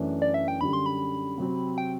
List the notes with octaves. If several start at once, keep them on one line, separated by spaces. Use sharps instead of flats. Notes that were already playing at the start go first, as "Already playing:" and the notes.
Already playing: F#2 E3 A3 D4
D5
E5
G5
F#2 D3 G3 B5
C6
B5
C3 F#3 C4
G5